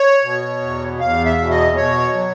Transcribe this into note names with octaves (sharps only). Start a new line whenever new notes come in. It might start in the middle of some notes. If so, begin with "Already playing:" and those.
Already playing: C#5
B2
E2
E2 F5
E5
B2
D#5
B2 C#5
F#3